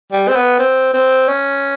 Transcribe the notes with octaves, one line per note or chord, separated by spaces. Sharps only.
G3
C4
B3
C4
C4
C#4